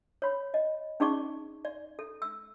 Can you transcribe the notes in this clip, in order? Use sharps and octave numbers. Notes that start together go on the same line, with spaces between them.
C#5 B5
D#5
C#4 D#4 G#4 D5 C#6 D6
D5
A4
E6